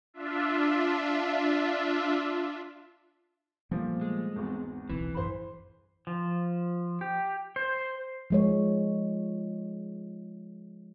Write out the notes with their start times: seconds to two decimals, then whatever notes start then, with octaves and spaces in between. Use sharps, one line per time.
0.14 D4 F4 E5
3.71 A#2 F3 G3 A3 B3
4.01 G#3
4.36 G#1 E2
4.89 D1 B1 E3 C4
5.14 A1 F#2 C5 B5
6.07 F3
7.01 G4
7.56 C5
8.30 F3 G#3 C#5